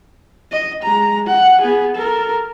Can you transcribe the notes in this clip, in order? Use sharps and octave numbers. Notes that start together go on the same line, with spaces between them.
D#5
G#3 A#5
F#5
B3 G#4
A4 A#4